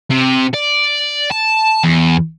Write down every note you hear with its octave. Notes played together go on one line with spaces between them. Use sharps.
C3
D5
A5
E2